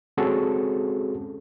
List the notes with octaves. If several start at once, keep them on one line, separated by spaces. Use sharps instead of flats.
G#3 C4 C#4 F#4 G#4 A4